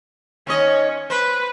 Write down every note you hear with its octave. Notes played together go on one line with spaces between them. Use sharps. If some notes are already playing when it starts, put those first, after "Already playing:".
D#2 C#4 C#5 D#5
B4 C5